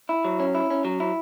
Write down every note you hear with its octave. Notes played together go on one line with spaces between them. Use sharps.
E4
F#3
C#4
E4
C#4
F#3
E4